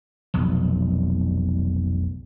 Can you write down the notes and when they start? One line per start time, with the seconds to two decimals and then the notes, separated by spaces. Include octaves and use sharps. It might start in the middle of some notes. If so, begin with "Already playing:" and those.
0.34 F1 B1